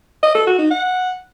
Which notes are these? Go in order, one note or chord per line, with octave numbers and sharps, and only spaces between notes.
D#5
A4
F#4
D#4
F#5